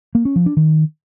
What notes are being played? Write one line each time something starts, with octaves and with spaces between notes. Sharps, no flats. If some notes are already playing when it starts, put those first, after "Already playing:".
A#3
C#4
F3
D4
D#3